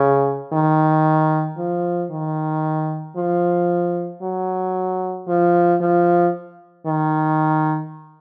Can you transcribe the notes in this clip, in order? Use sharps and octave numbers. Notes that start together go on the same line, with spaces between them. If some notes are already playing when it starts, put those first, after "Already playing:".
Already playing: C#3
D#3
F3
D#3
F3
F#3
F3
F3
D#3